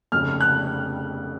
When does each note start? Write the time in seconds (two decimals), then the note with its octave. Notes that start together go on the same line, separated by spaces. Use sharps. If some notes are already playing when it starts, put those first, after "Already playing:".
0.12 F1 F2 C#3 F6
0.41 F#6